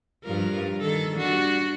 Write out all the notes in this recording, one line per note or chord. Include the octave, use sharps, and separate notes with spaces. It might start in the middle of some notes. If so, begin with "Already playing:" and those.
G2 F3 A#4
D#3 A4
G3 D4 F#4